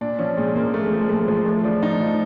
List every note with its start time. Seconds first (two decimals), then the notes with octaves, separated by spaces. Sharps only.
0.01 A#2 D4
0.19 F3 C#4
0.37 A#2 G#3
0.55 F3 A#3
0.74 A#2 A3
0.82 G#3
0.92 F3
1.01 G#3
1.09 A#2 A3
1.28 F3 G#3
1.46 A2 A3
1.64 F3 D4
1.82 A2 D#4
2.01 F3